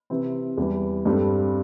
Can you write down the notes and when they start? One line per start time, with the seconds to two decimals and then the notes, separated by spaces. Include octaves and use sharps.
0.10 C3 E3 C4
0.58 E2 E3 G3
1.06 G2 G3 C4 A4